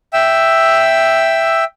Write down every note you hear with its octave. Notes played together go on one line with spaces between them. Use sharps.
E5 G5 E6